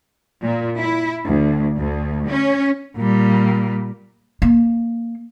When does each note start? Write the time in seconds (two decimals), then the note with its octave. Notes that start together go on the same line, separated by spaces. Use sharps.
0.42 A#2
0.80 E4
1.27 D2
1.77 D2
2.28 C#4
2.97 A#2 G3
4.42 A#3